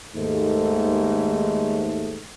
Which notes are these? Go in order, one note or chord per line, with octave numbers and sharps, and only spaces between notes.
D#2 G#2 A3